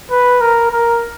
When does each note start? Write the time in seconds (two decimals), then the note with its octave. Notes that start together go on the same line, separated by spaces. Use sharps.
0.11 B4
0.41 A#4
0.71 A#4